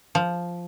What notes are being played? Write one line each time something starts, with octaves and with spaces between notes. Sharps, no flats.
F3